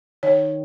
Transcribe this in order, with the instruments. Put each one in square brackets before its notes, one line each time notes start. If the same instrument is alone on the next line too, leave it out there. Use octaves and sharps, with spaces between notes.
[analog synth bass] D#3 [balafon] C#5